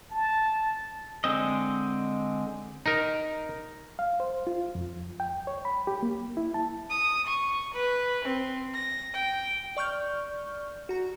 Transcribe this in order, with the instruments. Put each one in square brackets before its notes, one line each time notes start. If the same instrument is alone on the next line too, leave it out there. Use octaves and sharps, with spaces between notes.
[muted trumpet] A5
[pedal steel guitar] D3 G#3 C4 D#5
[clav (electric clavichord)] D#4 A#4
[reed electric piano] F5
C5
F4
F2
G5
C#5
B5
G4
A#3
E4
A5
[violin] D#6
C#6
B4
C4
A#6
G5
[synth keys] D5 C#6 F6 G6
F#4 A#5